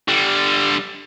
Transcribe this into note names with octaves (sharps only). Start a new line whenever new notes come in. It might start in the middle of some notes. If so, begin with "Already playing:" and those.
D3 G3